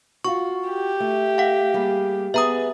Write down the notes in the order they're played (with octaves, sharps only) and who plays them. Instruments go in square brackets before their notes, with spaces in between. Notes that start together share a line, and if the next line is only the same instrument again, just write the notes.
[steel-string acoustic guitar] F4 F#4 [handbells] C#6
[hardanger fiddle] G4
[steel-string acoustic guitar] A3
[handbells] F5 F#5
[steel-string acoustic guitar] G3 A#3 G#4
[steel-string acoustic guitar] B3 G#4 [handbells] E5 A#5 D#6